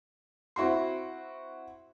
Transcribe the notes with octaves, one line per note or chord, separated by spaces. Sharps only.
C4 E4 F#4 C6